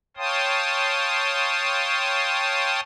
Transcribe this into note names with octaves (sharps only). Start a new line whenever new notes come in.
C#5 F5 G5 A5 C6 D#6